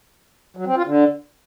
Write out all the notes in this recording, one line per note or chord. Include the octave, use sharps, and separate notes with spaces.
F#3
C4
F4
D3